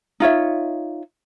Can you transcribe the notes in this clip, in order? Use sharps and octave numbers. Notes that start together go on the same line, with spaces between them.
D#4 F4 C#5 E5